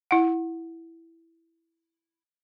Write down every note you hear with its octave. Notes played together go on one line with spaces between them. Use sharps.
E4 F#5